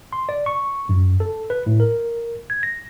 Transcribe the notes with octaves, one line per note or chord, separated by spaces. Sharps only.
C6
D5
C#6
F#2
A4
B4
A2
A#4
G#6
A#6